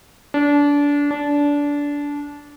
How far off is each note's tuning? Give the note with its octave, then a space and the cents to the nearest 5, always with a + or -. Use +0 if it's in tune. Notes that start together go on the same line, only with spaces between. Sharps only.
D4 -25
D4 -20